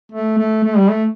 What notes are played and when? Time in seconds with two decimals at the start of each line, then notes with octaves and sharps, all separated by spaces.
0.12 A3
0.38 A3
0.64 A3
0.77 G3
0.90 A3